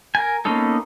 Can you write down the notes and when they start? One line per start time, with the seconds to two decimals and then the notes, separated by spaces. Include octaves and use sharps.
0.15 A#4 G#5
0.45 A#3 B3 C#4 D#4 A4